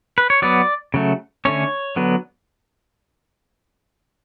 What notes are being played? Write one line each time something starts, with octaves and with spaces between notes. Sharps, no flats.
B4
C#5
F#3 B3 D5
C#3 F#3 A3
D3 A3 C#4 C#5
D3 F#3 B3